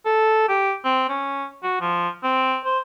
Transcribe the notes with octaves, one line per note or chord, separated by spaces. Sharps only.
A4
G4
C4
C#4
F#4
F3
C4
C5